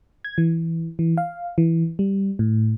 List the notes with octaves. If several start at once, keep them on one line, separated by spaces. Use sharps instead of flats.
G#6
E3
E3
F5
E3
G3
A2